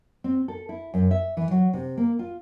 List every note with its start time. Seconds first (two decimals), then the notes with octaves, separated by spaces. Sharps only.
0.24 C4
0.48 A4
0.69 E4
0.94 F#2
1.11 E5
1.37 E3
1.51 F#3
1.73 C3
1.97 A#3
2.19 F4